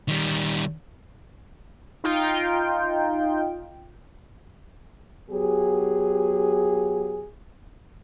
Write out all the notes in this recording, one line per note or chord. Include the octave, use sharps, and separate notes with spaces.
D#3 G3
D#4 F4 G5
F#3 B3 G4 G#4